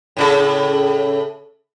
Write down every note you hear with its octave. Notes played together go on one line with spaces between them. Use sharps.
A2 C#3 A4